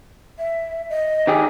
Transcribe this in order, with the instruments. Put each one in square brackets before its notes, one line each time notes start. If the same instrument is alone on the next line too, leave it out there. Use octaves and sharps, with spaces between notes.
[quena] E5
D#5
[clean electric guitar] D#3 G4 G#4